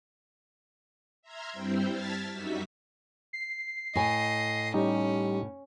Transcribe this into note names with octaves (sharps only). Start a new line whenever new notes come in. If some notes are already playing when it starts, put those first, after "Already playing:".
E5 A#5 C6 F6 G#6
G2 G3 C4 E4 C5 G5
A5 F6 G#6 A6 B6
F#2 G3 D#4 F#4 E5 B6
C7
A2 D#5 G#5
G3 C#4 D#4 G4